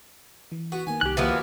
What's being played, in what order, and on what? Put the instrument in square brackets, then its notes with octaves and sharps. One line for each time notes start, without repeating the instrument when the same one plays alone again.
[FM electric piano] E3
[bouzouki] B3 [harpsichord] F#4
[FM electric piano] D#3 A#3 [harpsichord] G#5
[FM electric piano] C2 D#3 [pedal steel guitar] G4 F#6
[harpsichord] D#2 B2 A#3 [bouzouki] E3 F3 B3